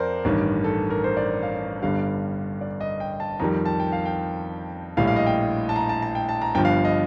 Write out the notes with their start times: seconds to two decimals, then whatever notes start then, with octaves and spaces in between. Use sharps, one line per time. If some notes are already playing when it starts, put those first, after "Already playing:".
Already playing: F2 A#4 C5 D5
0.25 A1 G2 D#3
0.64 A4
0.90 A#4
1.04 C5
1.17 D5
1.43 F5
1.82 G1 G2 D3 G3 F5
2.61 D5
2.81 D#5
3.00 G5
3.20 A5
3.40 F2 D#3 G3 A#5
3.66 A5
3.80 G5
3.92 F5
4.06 G5
4.97 A#1 A2 G3 F5
5.07 F5
5.16 D#5
5.26 G5
5.69 A5
5.76 A#5
5.89 A5
6.02 A5
6.15 G5
6.29 A5
6.42 A#5
6.55 G1 G2 F3 G5
6.65 F5
6.85 D#5